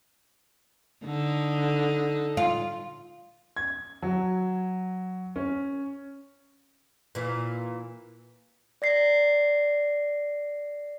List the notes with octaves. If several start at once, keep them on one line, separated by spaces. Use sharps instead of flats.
D3 D#4 A4
F4
G#6
F#3
C#4
A#2 E3
D5 A#6 C7